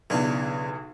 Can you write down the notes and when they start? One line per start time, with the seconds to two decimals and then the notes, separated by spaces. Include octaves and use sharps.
0.10 B1 E2 C#3 D4